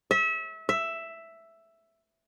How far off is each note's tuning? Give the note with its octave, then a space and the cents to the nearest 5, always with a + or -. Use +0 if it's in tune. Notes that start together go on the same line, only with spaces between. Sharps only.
E5 -30
E5 +5